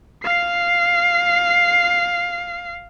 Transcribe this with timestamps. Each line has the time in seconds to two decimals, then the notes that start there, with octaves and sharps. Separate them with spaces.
0.24 F5 C7